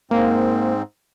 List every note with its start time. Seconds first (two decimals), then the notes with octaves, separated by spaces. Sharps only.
0.11 G#2 A#3 C4